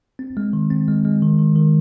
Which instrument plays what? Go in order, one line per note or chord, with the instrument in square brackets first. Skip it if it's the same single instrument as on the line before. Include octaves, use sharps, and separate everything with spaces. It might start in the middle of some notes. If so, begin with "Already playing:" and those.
[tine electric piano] C4
G#3
D#3
C4
G#3
G#3
D#3
D#3
D#3